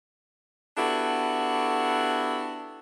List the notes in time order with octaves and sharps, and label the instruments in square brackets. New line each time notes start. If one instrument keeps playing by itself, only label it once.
[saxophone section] B3 D4 E4 F#4 G4 A4